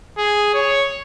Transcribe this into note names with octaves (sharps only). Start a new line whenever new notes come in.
G#4
C#5